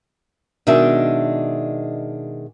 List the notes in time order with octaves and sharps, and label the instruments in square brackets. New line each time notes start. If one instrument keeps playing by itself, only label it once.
[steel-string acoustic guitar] B2 D#3 G#3 D4 E5